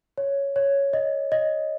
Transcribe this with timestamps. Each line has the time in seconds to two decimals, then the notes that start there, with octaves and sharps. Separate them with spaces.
0.18 C#5
0.56 C#5
0.93 D#5
1.32 D#5